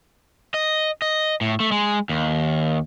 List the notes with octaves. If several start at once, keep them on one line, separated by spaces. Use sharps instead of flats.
D#5
D#5
A2
A3
G#3
D#2